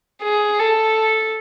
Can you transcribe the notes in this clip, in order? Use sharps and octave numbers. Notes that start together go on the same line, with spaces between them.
G#4
A4